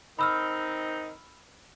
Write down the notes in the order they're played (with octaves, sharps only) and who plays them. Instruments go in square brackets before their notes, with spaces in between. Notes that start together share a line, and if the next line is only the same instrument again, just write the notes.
[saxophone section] D#3 C4 D#4 [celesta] B5 E6 F6